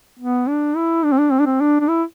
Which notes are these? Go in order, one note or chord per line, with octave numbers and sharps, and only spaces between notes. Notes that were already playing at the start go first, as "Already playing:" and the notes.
B3
D4
E4
D4
C4
D4
C4
D4
C4
D4
D4
E4